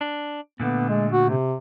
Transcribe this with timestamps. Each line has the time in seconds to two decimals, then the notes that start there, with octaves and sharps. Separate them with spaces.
0.01 D4
0.60 A#2 D3 A3 B3
0.89 G#3
1.12 F#4
1.29 C3